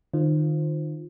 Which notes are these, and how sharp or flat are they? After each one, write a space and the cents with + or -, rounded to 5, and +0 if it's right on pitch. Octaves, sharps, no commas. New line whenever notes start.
D#3 -35 F4 +0 C5 +0